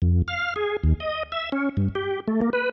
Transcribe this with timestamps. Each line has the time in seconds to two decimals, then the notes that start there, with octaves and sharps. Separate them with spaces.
0.02 F2
0.28 F5
0.56 G#4
0.84 D#2
1.00 D#5
1.32 E5
1.52 C#4
1.77 G2
1.95 G4
2.28 A3
2.41 A#3
2.53 B4